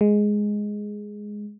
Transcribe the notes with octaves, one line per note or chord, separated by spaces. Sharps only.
G#3